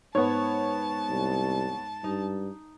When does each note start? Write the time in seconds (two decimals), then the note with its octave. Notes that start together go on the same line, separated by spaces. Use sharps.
0.15 G#2 B3 C#5 A5
1.09 C2
2.04 G2 D#4